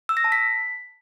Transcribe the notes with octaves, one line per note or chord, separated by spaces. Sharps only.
E6
A#6
A5
B6